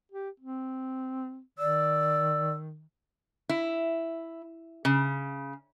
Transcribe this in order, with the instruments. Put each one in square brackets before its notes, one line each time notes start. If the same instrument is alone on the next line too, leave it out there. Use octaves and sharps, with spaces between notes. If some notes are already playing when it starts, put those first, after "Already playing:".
[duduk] G4
C4
[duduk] D#3 [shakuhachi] D5 [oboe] E6
[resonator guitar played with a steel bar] E4
C#3